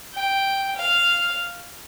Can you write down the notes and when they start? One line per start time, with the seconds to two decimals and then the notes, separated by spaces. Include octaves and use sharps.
0.14 G5
0.76 F5